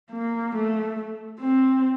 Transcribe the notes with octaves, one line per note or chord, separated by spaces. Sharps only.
A#3
A3
C4